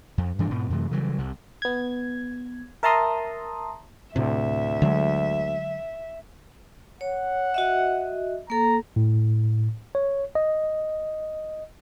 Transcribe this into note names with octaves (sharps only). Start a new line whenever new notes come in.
F2
G2 E3 D4
G#2 B2
F#2 C3 E3 A3
C#3 E3 F#3 G3
C2 C3
B3 G#6
A#4 E5 A5 A#5 C6 D#6
D2 A2 C3 E5
D3 F#3 G#3
C#5 F#5
F#4 D#5 E5
A#3 A4 A#5
A2
C#5
D#5